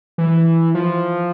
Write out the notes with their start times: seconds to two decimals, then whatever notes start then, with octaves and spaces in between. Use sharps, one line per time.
0.18 E3
0.75 F3